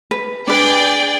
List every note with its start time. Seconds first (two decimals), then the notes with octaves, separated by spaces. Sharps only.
0.11 B4
0.48 D4 G#4 B4 D5 G5